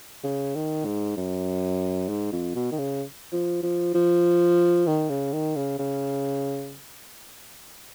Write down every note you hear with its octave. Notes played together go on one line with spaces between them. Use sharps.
C#3
D#3
G#2
F#2
G#2
F2
B2
D#3
C#3
F3
F3
F3
D#3
C#3
D#3
C#3
C#3